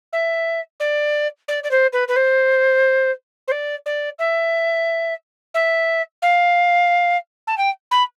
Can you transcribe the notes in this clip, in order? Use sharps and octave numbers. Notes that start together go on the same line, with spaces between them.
E5
D5
D5
D5
C5
B4
B4
C5
C5
D5
D5
E5
E5
F5
A5
G5
B5